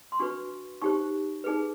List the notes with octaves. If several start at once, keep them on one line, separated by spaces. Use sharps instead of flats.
C6
D4 F#4 B4 C#6
D#4 G4 C5 C#6
D#4 G#4 B4